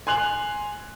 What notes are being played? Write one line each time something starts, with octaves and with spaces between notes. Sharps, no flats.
G#5 C6 F#6 F7 F#7